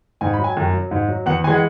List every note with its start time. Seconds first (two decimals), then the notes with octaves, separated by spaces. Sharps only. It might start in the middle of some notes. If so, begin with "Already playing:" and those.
0.21 G#2 G#5
0.34 B5
0.39 F#3
0.44 G#5
0.57 F#2
0.74 F#3
0.91 G#2
1.08 F#3
1.26 E2 F#5
1.44 E3 G#5
1.47 G#3
1.53 F#5